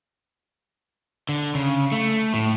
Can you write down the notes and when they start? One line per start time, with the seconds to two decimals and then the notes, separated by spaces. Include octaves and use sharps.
1.29 D3
1.55 C#3
1.92 A3
2.34 A2